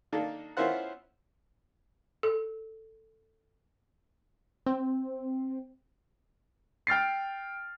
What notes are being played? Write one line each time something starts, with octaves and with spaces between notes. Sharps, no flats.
D#3 A#3 D4 A4
B3 C#4 E4 F4 C5 F#5
A4
C4
G5 F6 A6 C7